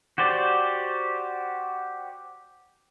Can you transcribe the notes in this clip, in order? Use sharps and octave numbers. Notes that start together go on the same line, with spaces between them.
F#4 G4 C5 D5